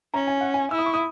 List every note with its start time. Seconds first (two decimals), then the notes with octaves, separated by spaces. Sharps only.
0.14 C#4 A#5
0.27 G#5
0.41 F#5
0.54 G#5
0.71 E4 E6
0.78 D#6
0.86 C#6
0.94 D#6